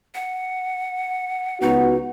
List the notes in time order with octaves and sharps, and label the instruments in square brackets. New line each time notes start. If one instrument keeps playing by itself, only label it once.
[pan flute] F#5
[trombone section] C#2 B3 F#4 [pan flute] D#4